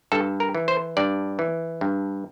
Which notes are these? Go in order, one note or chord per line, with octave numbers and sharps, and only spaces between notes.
G2 A4
A#4
E3
C5
G2 D5
E3
G2